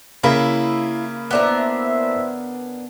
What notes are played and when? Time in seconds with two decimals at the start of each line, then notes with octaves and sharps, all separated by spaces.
0.24 C#3 A#3 E4 B5
1.31 B3 D4 E4 A#4 C5 E5